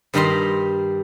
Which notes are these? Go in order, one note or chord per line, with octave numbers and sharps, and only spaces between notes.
G2 D#3 G3 G4 A#5 C6